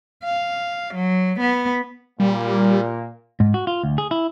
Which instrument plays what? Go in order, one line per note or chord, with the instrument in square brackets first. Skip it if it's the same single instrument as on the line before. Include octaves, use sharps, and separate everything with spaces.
[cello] F5
F#3
B3
[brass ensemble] A#2 A#3 [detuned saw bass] G3
[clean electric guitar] G#2
F#4
F4
D2
G#4
E4